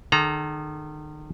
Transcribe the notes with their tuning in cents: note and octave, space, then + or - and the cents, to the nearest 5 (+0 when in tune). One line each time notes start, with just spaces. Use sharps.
D#3 -35 A4 -45 A#5 +0